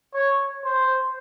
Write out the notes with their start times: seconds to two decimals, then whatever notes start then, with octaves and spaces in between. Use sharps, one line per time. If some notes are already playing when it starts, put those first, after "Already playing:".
0.14 C#5
0.65 C5